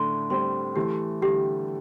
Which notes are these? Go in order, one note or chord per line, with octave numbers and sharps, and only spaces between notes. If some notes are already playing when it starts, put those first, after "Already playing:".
Already playing: A2 D3 A3 D4 C6
G3 C4 C6
E3 A3 G4
D3 G3 G4